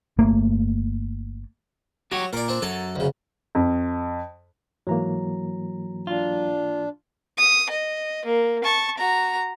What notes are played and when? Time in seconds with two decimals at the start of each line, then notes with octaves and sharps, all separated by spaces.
0.18 G1 A3 A#3
2.12 F#3 F#4 G4 C#5
2.33 A#2 A#4 D5
2.48 C4 D4
2.62 F#2 F#3 A4
2.96 D2 C#3
3.55 F2
4.87 G#2 E3 F#3 A#3 A#5
6.07 D4 F4
7.38 D#6
7.70 D#5
8.25 A#3
8.64 A5 C#6
8.98 F#4 A#5